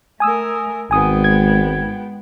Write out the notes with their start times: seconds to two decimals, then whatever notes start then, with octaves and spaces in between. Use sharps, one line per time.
0.20 A3 A#4 G#5 D#6 E6
0.91 G#1 G#3 B3 G5 G#5 D#6
1.24 G#6